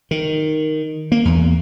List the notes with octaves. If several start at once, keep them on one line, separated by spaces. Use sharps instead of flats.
D#3
A#3
E2